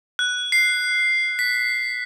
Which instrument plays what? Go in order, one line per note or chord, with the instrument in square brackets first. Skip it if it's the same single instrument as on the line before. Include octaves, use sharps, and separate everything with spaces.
[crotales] F#6
C7
B6